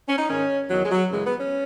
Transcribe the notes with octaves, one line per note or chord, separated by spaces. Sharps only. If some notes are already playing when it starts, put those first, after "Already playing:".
C#4
D#4
G#2 D#3 C#4
E2 D#3 F#3
G#3
F#3
F#2 C#3 E3 G#3
B3
C#4